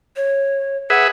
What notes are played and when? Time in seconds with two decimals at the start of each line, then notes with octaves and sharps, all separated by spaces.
0.16 C#5
0.90 G#4 B4 E5 F#5